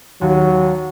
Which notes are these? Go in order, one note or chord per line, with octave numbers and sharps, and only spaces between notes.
D#2 F#3